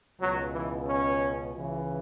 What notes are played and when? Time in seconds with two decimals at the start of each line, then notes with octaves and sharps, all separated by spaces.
0.20 C#2 B2 F#3
0.53 E3
0.87 C#4
1.54 C#2 C#3 E3